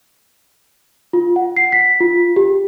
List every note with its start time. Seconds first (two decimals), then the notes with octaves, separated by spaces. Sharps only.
1.13 F4
1.36 F#5
1.57 C7
1.72 B6
2.00 F4
2.36 G4